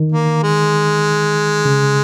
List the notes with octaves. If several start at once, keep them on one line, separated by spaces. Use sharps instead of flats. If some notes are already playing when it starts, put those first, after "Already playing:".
Already playing: D#3
A#3
G#3
C#3